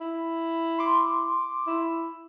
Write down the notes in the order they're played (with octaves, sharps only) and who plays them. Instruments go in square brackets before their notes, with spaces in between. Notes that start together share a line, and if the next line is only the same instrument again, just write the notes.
[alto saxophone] E4
[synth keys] C6 D6
[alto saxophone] E4